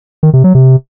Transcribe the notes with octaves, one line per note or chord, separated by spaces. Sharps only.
D#3
C3
F#3
C3